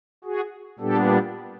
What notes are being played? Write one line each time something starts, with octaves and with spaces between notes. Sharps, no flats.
F#4 G#4
A#2 G3 B3 D4 G4 A4